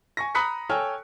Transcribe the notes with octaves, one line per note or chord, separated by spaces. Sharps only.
G#5 C#6 A#6
A#5 B5 D#6 F#6 B6 C#7
A4 C#5 G5 G#5 E6 F6